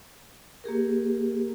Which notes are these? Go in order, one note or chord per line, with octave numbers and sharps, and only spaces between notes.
A#3 G4 G#4 A#4